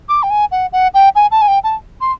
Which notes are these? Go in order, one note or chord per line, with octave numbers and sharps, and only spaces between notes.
D6
G5
G#5
F#5
F#5
G5
G#5
A5
G#5
G5
A5
C6